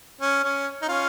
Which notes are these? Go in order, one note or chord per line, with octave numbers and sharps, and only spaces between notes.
C#4
C#4
D#4
C#4 F4